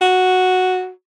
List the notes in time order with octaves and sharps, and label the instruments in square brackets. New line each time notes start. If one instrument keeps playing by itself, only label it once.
[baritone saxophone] F#4